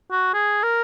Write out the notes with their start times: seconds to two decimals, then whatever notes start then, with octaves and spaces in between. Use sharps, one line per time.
0.11 F#4
0.34 G#4
0.63 A#4